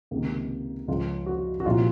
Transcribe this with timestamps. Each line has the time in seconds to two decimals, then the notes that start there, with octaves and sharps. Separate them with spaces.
0.11 C#2 C3 D#3 A#3
0.88 C#2 C#3 F3 F4
1.26 F#4
1.60 F#4
1.66 C2 A#2 F3 F4